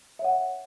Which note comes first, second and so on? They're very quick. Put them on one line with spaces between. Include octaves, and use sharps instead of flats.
E5 C#5 F#5